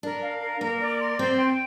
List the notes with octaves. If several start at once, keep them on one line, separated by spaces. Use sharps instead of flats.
D4 A#4
F5
A#4
A#3 A#4
D5
C6
C4 C5
G5